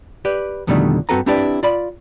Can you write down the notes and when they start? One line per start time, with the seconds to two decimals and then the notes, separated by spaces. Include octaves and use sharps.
0.25 G4 B4 D5
0.67 F2 B2 D3 D#3 G3 A3
1.09 G2 C4 F#4 A4 B4 A#5
1.26 C4 D4 E4 G4 B4 D5
1.63 F4 D5 B5